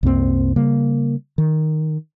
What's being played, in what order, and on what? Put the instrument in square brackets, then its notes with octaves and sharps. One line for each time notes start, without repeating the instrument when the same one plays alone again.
[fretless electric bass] C2 F#2 A#3 C4
C#3 G3 A#3
D#3